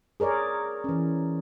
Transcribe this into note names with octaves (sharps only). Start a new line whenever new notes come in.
G#4 A#4 C#5 D5
E3 C#4